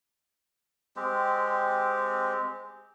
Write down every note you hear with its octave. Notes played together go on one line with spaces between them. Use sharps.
G#3 C4 G4